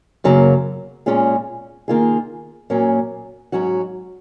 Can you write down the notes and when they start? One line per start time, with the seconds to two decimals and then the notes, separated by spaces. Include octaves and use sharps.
0.24 F#2 C#3 F#3 A#3
1.06 A#2 G#3 C#4 F4 G#4
1.88 D#3 A#3 F4 G#4
2.70 A#2 F#3 A#3 C#4
3.52 G#2 F#3 C#4 F#4